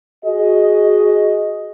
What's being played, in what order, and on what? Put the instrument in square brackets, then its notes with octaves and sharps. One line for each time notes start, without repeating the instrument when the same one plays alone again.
[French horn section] F#4 G#4 D#5